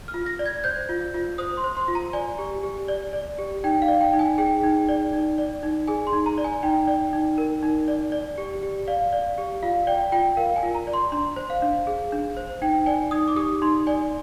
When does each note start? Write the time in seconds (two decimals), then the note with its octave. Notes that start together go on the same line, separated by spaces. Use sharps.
0.08 F6
0.14 F4
0.26 A#6
0.39 D5
0.46 G#6
0.64 C5 G6
0.89 F4
1.14 F4
1.38 C5 D#6
1.57 C6
1.64 C5
1.77 C6
1.88 F4
1.95 A#5
2.13 D5 G#5
2.39 G4
2.63 G4
2.88 D5
3.13 D5
3.39 G4
3.64 D#4 G5
3.82 F5
3.88 D5
4.01 G5
4.13 D#4
4.19 G#5
4.38 G#4 G5
4.63 D#4
4.88 D5
5.13 D#4
5.38 D5
5.63 D#4
5.87 G#4 G#5
6.07 C6
6.13 D#4
6.26 A#5
6.38 D5
6.44 G#5
6.63 D#4 G5
6.87 D5
7.13 D#4
7.38 A#4
7.63 D#4
7.88 D5
8.12 D5
8.38 G4
8.63 G4
8.88 D5 F5
9.13 D5
9.38 G4
9.63 F4 F5
9.87 D5 G5
10.12 F4 G5
10.37 A#4 F5
10.56 G#5
10.63 F4
10.75 A#5
10.87 D5
10.93 C6
11.12 D4 C6
11.36 C5
11.50 F5
11.62 D4
11.87 G#4
12.12 D4
12.37 C5
12.61 D#4 G5
12.86 D5 G#5
13.11 D#4 D#6
13.28 D6
13.36 G4 D#6
13.62 D#4 C6
13.87 D5 G#5